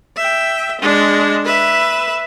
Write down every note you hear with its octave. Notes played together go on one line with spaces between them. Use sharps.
E5 G5
G#3 D4
B4 E5